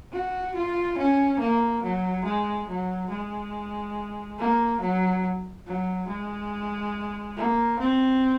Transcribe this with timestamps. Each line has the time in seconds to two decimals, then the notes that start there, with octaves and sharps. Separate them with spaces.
0.12 F#4
0.55 F4
0.98 C#4
1.39 A#3
1.83 F#3
2.25 G#3
2.68 F#3
3.10 G#3
4.39 A#3
4.81 F#3
5.67 F#3
6.08 G#3
7.37 A#3
7.79 C4